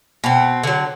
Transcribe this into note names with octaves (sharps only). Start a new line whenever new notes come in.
B2 C4
D3 F#3